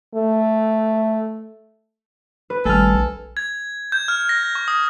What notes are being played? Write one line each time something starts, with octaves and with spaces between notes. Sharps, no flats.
A3
B4
G#1 G3 A3 A4 G#5 F6
A#1
G#6
G6
F6
A#6
C#6
D#6